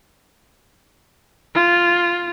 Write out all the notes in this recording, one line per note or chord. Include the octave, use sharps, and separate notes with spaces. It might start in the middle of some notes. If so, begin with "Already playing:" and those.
F4